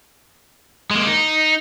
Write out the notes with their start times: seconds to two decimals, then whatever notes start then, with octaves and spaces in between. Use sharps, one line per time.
0.91 G#3 A#3
1.06 D#4